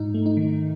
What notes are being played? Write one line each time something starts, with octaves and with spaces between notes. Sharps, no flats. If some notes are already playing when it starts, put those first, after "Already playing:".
Already playing: G#2 D#4
A3
D#4
D#3